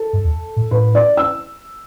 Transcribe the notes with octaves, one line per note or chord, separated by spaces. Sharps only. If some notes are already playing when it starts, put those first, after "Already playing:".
Already playing: A4
G2
E2
A2
A2 B4
D5
E6